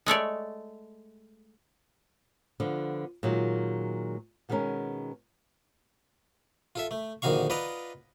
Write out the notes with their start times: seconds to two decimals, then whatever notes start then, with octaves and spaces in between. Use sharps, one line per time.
0.06 G#3 A3 C#5 D5
2.60 D3 F3 B3
3.23 A#2 D#3 F#3 G#3
4.49 B2 D#3 G#3 B3 C#4 A#4
6.75 F4 A4 E5
6.91 A3
7.22 A#1 D3 D#3 F#4 F5 C#6
7.50 F4 B4 D5 D#5 F#5 A#5